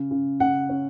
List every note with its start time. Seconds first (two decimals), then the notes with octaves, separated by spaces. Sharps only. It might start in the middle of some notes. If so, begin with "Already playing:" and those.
Already playing: C#3
0.11 C#3
0.40 C#3 F#5
0.69 C#4